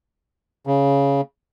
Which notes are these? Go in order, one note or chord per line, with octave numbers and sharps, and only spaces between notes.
C#3